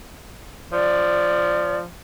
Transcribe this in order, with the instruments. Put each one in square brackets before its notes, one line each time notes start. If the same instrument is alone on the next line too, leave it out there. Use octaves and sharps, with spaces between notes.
[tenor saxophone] F3 [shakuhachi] D5